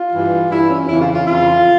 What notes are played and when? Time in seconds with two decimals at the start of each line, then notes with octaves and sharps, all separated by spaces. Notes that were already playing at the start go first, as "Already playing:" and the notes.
Already playing: F4
0.12 G2 E3
0.50 G2 E3 E4
0.70 C#4
0.88 F2 C#3 E3 E4
1.01 F4
1.13 F4
1.27 F2 C#3 E3 F4